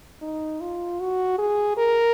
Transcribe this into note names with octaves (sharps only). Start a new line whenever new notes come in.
D#4
F4
F#4
G#4
A#4